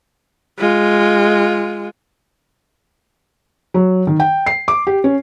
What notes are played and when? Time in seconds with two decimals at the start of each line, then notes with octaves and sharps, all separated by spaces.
0.58 G#3 F4
3.74 F#3
4.07 D#3
4.20 G5
4.46 C7
4.68 D6
4.87 G4
5.04 C#4